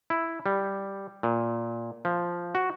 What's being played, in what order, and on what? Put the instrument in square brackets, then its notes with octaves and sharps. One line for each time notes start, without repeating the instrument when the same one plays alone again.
[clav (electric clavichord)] E4
G3
A#2
F3
F#4